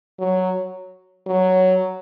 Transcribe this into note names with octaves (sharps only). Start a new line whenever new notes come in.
F#3
F#3